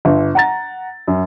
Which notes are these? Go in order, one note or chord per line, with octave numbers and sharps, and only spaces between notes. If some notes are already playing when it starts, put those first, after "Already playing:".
G1
F#5 A#5 A6
F#2